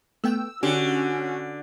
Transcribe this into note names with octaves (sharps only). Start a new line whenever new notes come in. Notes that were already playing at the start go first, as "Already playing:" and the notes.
A3 B3 G5 E6
D3 C#4 F#4 G4